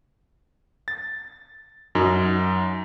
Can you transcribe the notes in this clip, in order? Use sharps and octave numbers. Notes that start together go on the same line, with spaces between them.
A6
F#2 D#4